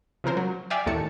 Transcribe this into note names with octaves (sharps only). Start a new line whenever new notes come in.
C#3 F3 C4 A#4 C5
F#3
D5 E5 F5 G5 G#5
D#2 A2 D#3 A3 A5 C#7